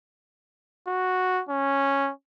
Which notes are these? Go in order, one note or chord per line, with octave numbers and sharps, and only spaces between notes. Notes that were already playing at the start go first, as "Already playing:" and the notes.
F#4
C#4